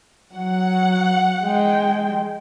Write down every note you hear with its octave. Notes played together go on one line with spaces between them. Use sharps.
F#3 F#5
G#3 G5